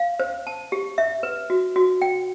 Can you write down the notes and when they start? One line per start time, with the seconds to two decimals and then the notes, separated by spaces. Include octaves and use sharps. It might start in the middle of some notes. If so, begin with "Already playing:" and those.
Already playing: F5
0.20 C5
0.47 A5
0.72 G4
0.98 E5
1.23 B4
1.50 F#4
1.76 F#4
2.02 G5